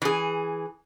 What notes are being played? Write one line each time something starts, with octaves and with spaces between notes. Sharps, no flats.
E3 G#4